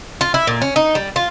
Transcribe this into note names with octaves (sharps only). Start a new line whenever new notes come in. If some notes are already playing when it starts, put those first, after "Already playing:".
F4
E4
A#2
C#4
D#4
G3
F4